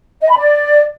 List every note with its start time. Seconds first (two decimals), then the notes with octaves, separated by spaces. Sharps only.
0.21 D#5
0.29 B5
0.37 D5